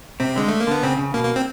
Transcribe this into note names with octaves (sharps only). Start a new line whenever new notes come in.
C3 C4
D3 G#3
A3
A#3
D3 B3
C#3 C4
C#3
B2 A#3
A#3
C4